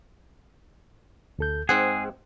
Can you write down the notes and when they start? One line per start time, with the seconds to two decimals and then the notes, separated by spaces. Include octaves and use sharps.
1.39 D2 A4 G6
1.69 G#2 C4 G#4 F#5 G#6